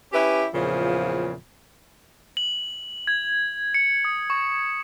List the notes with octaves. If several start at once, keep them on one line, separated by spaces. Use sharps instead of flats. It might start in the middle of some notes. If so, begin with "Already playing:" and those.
C#4 E4 G4 B4
E2 A#2 C#3 F3
F#7
G#6
C#7
D#6
C#6